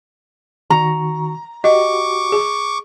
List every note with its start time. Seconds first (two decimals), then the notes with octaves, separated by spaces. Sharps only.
0.70 D#3 F#4 A#5 C#6
1.64 F#4 G4 D#5 C#6 D6
2.32 G#4